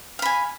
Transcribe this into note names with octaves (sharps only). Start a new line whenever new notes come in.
F5 G#5 B5